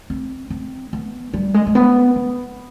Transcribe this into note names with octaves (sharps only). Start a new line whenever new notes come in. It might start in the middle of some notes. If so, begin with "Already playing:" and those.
C4
C4
B3
G3
G#3
G#3
B3
B3